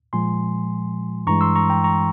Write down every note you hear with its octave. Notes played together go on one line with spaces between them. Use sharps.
A#2 F3 G#3 G#5 C6
G2 E3 G#3 A#5 C#6
C6 E6
A#5 C#6
G5 A#5
A#5 C#6